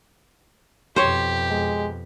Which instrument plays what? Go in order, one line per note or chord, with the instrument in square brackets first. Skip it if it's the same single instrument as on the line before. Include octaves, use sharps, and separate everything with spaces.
[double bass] F2 B2 [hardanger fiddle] G4 [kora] C5 C#5
[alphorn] G#3